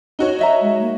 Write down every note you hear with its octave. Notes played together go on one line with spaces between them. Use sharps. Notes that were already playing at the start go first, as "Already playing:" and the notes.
D#4 F#4 C#5
D#5 E5 A#5
G#3
A#3